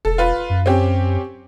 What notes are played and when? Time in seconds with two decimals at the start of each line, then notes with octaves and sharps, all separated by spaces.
0.05 E1 A4
0.18 F4 B4
0.50 F#2
0.66 C4 C#4 G4